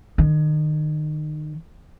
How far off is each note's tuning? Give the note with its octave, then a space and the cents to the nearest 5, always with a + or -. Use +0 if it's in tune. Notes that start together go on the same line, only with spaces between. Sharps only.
D#3 -30